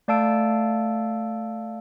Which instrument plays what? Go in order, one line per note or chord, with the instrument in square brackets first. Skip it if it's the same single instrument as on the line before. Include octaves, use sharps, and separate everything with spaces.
[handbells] A3 D5 F5 A5 E6 D7